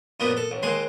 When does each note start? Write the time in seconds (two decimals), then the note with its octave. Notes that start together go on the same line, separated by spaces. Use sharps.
0.20 F#2 A#2 F3 B3
0.37 A4
0.51 A1
0.63 D#2 G#3 C6